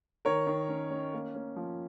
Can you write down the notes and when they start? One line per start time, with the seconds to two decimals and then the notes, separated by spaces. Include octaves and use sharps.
0.25 D#3 A#4 C#5
0.47 D#3
0.69 C#4
0.91 C#4
1.13 A#3
1.35 C#4
1.56 F3